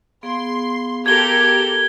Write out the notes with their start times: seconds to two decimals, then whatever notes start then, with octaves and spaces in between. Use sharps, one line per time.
0.23 B3 G#4 F5 C6
1.06 G4 A4 A#4 G#6 G7